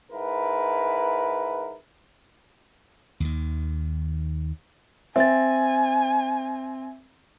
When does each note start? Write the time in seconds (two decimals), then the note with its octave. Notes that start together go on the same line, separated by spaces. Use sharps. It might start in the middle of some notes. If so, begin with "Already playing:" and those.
0.12 G#2 E4 A#4 B4
3.20 D#2 D#3
5.16 C4 E5 G#5 A6